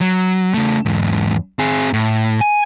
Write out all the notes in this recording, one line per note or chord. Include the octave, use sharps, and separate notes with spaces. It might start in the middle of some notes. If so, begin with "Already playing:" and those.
F#3
C#3 A3
E2 G#2
C4 G#4
A2
G#5